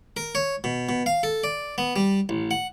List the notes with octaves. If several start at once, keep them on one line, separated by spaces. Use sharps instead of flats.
A#4
C#5
B2
B2
F5
A4
D5
B3
G3
A1
F#5